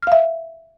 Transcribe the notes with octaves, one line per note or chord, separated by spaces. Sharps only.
E5 F5 F6